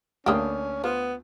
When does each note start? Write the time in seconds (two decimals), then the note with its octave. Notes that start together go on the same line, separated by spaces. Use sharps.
0.26 D2 D3 A#3 C#4 D4 G4 D#6
0.84 B3 F4 C5